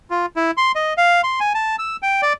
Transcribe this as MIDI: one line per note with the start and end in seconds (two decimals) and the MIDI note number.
0.10 0.26 65
0.36 0.51 64
0.57 0.72 84
0.75 0.93 75
0.97 1.21 77
1.24 1.40 84
1.40 1.53 80
1.54 1.76 81
1.79 1.96 88
2.02 2.21 79
2.22 2.33 74